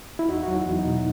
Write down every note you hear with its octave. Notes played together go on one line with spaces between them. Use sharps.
E4
E2 D#4 F#4
F#3 F#4
E4
E2
D#4
B2